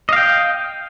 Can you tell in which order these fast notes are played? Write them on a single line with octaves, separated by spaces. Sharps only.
D#5 F5 G5